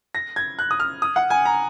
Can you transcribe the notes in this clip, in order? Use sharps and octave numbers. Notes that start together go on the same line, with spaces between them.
A#6
G#6
F#6
D#6
F6
D#6
F#5
G#5
A#5